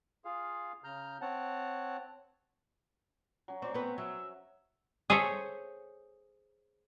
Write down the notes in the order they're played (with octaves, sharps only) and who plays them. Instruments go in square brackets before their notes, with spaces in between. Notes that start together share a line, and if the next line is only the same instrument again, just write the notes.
[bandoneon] F4 G#4 F5
C#3 A#5 F6 G6
C4 C#5 F#5 A5
[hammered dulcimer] F#3 C#4
[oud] C4 [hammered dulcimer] F#4 C#6 [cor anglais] D5
[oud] B3 B4 [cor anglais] C4
[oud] F#3 [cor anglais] E5
[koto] G#4 A4 C5 C#5 E5